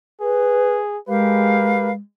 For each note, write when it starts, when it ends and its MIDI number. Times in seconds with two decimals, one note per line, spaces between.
0.21 0.98 68
0.21 0.75 71
1.08 1.95 56
1.08 1.89 67
1.08 1.89 70
1.08 1.91 71
1.08 1.89 77